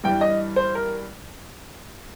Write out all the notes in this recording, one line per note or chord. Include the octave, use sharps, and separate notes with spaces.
G2 E3 G3 G5
D#5
C5
A#4